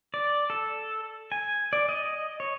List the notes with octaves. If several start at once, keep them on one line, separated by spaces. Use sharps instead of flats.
D5
A4
G#5
D5
D#5
C#5